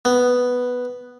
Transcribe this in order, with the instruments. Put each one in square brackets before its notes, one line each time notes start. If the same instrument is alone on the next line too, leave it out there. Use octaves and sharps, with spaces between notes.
[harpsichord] B3